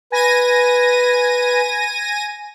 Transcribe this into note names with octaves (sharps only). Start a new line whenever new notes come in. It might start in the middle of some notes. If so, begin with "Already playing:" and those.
B4 G#5 A#6 D#7